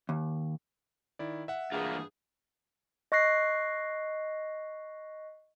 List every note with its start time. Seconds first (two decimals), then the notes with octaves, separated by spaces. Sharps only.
0.09 D#2
1.19 D#3 E4 D5
1.48 E5 F#5
1.72 G2 E3 A#3 F4 G#4
3.12 D#5 C#6 F#6 A#6 C7